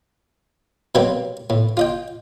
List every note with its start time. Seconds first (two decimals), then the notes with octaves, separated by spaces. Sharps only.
0.95 B2 F#3 G3 A#3 C4
1.50 A2
1.77 F4 D#5 G5